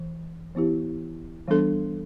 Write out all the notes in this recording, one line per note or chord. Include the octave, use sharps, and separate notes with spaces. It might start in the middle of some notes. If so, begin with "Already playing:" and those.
Already playing: E3
E3 B3 E4 G4
E3 G3 B3 D4 A4